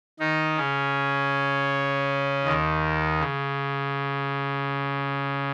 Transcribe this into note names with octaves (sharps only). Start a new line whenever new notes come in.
D#3 D#4
C#3 C#4
D#2 D#3
C#3